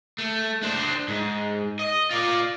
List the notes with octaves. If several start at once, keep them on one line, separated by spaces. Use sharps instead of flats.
A3
D4 C5
G#2
D#5
F4 D5